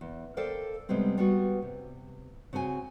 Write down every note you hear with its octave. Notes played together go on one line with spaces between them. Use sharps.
E2
A4 A#4 C5 D5 F5 G5
C3 G3 G#3 B3 C4
G3 B3 F#4
C3
C#3 C4 F#4 G#5